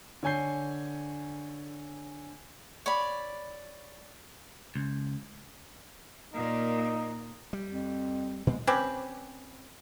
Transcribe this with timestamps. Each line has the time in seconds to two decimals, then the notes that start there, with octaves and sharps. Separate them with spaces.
0.23 D3 C#5 G#5 G6 C7
2.86 C#5 D5 B5
4.76 C#2
6.34 A#2 A#3 D#4
7.53 G3
7.69 F2
8.47 A#2 G#3 B3 C4
8.67 C4 C#4 G4 B4